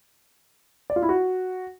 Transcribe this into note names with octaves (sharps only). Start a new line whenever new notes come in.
D5
F4
E4
F#4